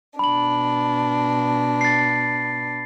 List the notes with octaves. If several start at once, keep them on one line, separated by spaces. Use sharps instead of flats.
B2 D4 B5 F#7
A6 C7